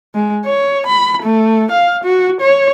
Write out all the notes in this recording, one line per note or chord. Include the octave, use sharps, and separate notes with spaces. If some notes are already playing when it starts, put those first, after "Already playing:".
G#3
C#5
B5
A3
F5
F#4
C#5